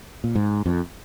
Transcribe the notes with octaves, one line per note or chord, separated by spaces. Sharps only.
A#2
G#2
F2